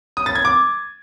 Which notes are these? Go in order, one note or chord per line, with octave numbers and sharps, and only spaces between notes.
D#6
A6
G#6
D6